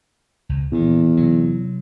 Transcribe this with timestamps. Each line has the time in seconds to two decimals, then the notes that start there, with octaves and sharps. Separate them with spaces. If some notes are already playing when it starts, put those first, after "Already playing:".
0.49 C#2
0.72 E2 A#2 D#3
1.17 C3 F#3